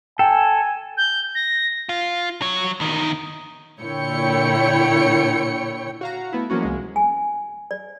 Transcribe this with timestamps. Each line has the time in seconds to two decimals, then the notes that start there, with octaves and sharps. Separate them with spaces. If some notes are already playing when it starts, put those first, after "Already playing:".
0.19 A4 G5 G#5
0.97 G6
1.34 A#6
1.89 F4
2.42 F#3 C#5
2.80 E2 D#3
3.80 A#2 D3 E4 C#5 G5 C#7
6.01 F#4 F5 A#5
6.33 A3 B3 E4
6.50 F3 F#3 A#3 C#4 F#4
6.62 C2 G#3
6.96 G#5
7.71 D5